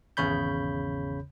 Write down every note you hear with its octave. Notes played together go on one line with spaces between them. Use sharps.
G#1 E2 C#3 C#5 B5 G6